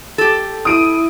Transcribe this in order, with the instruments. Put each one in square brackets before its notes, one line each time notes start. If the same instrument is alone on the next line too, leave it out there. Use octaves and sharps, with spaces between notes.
[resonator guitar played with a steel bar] G4 A4
[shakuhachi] E4 [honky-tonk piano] D#6 D7 D#7